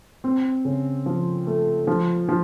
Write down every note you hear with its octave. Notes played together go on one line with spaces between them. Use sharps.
C4
C#3
F3
A3
F3
F3